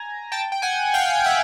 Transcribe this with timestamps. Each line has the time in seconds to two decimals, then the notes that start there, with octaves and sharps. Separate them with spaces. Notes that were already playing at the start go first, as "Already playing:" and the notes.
Already playing: G#5 A#5
0.32 G5 A5
0.52 G5
0.62 F#5 G#5
0.94 F5 G5
1.25 E5 F#5